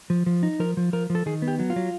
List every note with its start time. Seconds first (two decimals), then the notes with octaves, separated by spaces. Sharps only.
0.10 F3
0.26 F3
0.43 D#4
0.60 F3 A#4
0.77 F3
0.93 F3 A#4
1.10 F3
1.15 A4
1.26 D#3 G#4
1.42 B3
1.48 G4
1.59 F#3
1.70 F4
1.76 F#3